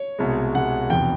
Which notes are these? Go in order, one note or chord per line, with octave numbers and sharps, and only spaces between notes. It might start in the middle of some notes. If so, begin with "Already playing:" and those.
Already playing: C#5
C2 B2 G#3
C2 B2 G#3 F#5
F1 E2 B2 G5